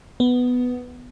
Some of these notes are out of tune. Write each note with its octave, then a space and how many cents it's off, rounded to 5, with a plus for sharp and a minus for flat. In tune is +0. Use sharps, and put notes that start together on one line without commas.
B3 +5